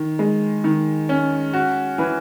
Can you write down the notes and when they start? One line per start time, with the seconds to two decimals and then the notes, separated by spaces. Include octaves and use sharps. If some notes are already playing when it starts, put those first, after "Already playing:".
Already playing: D#3
0.19 G#3
0.64 D#3
1.09 C#4
1.54 F#4
1.98 E3